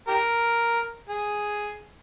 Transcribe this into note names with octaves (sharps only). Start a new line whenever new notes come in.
G4 A#4
G#4